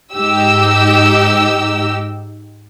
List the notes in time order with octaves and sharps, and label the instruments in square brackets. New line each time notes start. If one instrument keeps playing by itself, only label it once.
[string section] G#2 D#4 G4 E6